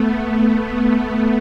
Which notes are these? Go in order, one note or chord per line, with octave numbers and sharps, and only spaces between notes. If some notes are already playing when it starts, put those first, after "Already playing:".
Already playing: A3 B3